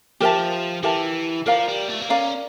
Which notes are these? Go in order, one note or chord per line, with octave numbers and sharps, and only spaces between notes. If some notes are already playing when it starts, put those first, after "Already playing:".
F3 G4 A#4 E5 A5
E3 G4 A#4 E5 A5
F3 A#4 D5 F5 A#5
G3
A3
A#3
C#4 A#4 D5 F5 A#5